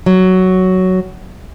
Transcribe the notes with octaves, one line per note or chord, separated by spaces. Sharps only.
F#3